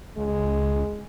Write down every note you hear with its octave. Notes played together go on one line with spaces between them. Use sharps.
C#2 G#3